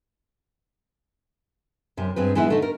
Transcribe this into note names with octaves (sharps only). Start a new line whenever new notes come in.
F#2 C3
G2 G#3 C4 B4
E3 G#3 B3 D#4 E4
D3 A3 D#4
A#4